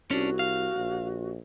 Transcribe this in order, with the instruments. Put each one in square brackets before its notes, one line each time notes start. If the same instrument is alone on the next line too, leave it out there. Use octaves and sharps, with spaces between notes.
[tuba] C2 [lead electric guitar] C#4 D4 [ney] F#4
[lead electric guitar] F5
[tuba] A#1